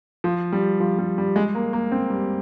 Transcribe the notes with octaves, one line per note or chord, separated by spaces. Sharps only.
F3
G3
F3
G3
G3
G#3
A#3
A#3
C4
G3